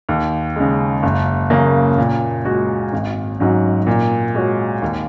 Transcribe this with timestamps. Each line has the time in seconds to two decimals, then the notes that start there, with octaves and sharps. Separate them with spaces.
0.09 D#2
0.56 C#3 G#3
1.03 F#1
1.50 F#2 C#3 A#3 C#4
1.98 A#2
2.45 G#3 F#4
2.93 G#1
3.40 G#2 F#3 C#4
3.87 A#2
4.35 G#3 F#4 C#5
4.82 D#2